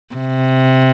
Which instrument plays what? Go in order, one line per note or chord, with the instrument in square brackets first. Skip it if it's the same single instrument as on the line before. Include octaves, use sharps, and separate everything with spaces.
[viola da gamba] C3